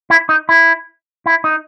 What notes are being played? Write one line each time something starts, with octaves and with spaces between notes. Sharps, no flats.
E4
D#4
E4
E4
D#4